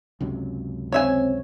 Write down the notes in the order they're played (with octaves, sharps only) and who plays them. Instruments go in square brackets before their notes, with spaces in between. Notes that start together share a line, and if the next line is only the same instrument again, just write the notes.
[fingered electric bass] C#2 F#2 C3
[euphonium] C4 [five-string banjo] C#5 E5 G#5